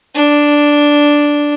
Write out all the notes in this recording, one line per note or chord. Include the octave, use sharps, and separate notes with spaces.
D4